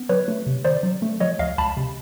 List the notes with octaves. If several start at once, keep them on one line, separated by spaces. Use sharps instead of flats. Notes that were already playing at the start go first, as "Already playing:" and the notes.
Already playing: B3
F#3 B4 C#5
A3
C3
D#3 C5 D5
F#3
A3
F3 C#5 D#5
C#2 D#5 F5
C#2 A5 B5
C3